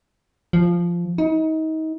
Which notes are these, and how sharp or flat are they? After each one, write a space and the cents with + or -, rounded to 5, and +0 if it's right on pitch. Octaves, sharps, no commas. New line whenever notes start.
F3 -10
D#4 +30